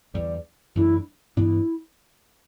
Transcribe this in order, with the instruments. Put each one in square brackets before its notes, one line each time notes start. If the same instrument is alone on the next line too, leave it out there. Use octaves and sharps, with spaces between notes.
[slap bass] E2 D3 G3 [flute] D5
[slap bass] F#2 E3 A3 D4 [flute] E4
[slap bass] G2 E3 B3 D4 [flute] E4